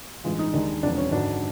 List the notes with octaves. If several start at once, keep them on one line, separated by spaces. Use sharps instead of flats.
A1 G2 E3 G#3 F4
D#4
D#2 D#3 G#3 D4
E1 D2 C3 F3 D4
C#4
G#1 F#2 D3 F#3 D4